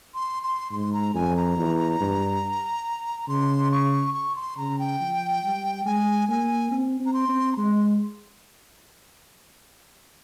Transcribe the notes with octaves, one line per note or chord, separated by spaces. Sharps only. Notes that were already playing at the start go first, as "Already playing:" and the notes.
C6
C6
G#2 C6
A#5
F2 G#5
A#5
E2
G2
C#3 C6
C#6
C#6
C6
C#3 A#5
G5
F3
G3
G#3 G#5
A#3 G#5
C4
C4
A#5
C6
C4
A#5
G#3 C6